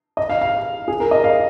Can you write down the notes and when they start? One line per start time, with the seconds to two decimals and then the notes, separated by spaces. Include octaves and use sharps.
0.17 D#5
0.29 F5
0.41 F5
0.88 G#4
1.00 A#4
1.11 D#5
1.24 F5